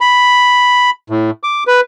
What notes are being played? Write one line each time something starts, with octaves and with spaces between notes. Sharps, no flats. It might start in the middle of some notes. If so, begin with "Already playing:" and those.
B5
A2
D6
B4